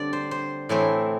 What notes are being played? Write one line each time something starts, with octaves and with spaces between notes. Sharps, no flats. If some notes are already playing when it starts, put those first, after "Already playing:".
Already playing: D3 G3 C4 D5
C5
C5
A2 E3 A3 C4